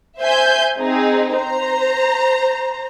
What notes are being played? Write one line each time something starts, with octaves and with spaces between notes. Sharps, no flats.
C5 E5 G#5 G6
C4 D#4 G#4
C5 A#5